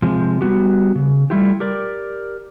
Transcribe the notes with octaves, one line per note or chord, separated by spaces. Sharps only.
C3 F3 G#3
G3 B3 F#4 G4
C#3
G3 A3 E4 F4 G4
G4 A#4 D5